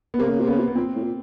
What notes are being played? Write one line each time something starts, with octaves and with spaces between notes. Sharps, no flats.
B3
C3 A#3
C#3
C3
C#3 B3
C3
B3
A#2 C4
A2
A#2